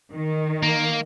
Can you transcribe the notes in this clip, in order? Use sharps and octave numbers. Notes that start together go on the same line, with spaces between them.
D#3
A#3